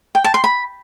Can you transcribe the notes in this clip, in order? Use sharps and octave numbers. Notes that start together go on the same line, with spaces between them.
G5
A5
C6
B5